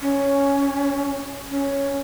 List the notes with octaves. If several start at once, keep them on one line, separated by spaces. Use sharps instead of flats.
C#4
C#4